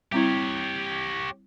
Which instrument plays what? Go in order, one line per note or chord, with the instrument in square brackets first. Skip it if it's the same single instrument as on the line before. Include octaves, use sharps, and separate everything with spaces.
[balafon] G3 C4 E4 [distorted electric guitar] G4 C#5